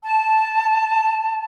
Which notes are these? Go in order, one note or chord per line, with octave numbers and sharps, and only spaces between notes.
A5